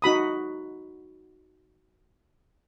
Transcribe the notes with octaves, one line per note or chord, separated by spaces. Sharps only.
D#4 F#4 B5 D#6